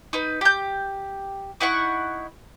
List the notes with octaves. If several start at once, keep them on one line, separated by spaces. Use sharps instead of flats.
D#4 B4
G4 G6
D#4 E4 F#5 C#6